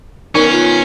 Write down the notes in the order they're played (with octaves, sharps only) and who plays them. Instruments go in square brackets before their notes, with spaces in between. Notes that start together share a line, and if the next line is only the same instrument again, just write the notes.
[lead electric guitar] D#3 B3 [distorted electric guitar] C#4 [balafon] D#4 [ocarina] A#4
[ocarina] F4